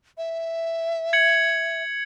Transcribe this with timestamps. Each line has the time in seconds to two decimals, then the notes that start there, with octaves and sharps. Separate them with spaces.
0.18 E5
1.13 G#6 C#7 F#7